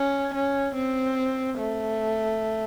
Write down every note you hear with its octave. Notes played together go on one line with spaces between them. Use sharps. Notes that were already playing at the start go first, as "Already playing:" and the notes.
Already playing: C#4
C#4
C4
A3